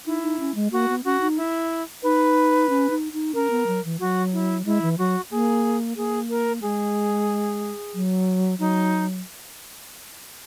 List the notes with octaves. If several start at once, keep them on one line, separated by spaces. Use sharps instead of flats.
D#4 E4
D#4
C#4
G#3
A#3 F#4
B3
C#4 F#4
D#4
E4
D#4 B4
C#4
D#4
D#4
C#4 A#4
B3
F#3
E3
F#3 F#4
E4
G#3 E4
E3
F#3 F#4
A#3 G#4
A#3 G#4
A#4
G#3 G#4
F#3
F#3 D#4